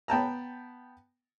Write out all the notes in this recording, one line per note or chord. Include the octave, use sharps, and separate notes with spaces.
B3 G5 A5 A#5